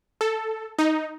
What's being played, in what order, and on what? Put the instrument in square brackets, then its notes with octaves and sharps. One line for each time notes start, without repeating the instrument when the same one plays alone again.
[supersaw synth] A4
D#4